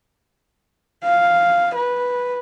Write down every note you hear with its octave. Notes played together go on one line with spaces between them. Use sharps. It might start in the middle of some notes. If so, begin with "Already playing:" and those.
F5
B4